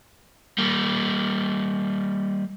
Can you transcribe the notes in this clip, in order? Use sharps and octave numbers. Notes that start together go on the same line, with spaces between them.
G3 A#3